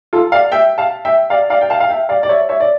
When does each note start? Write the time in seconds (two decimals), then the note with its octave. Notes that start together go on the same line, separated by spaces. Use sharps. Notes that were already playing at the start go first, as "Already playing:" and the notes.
0.13 F4 A4
0.32 D5 F5
0.52 E5 G5
0.78 F5 A5
1.05 E5 G5
1.30 D5 F5
1.50 D5 F5
1.61 G5
1.70 F5 A5
1.80 F5
1.89 E5 G5
2.09 D5 F5
2.23 D5
2.29 C#5 E5
2.49 C#5 E5
2.60 D5